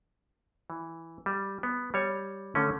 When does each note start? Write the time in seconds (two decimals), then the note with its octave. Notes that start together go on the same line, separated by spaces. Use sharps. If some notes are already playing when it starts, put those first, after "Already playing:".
0.70 E3
1.26 G3
1.63 B3
1.94 G3 C#5
2.55 D3 A3 C#4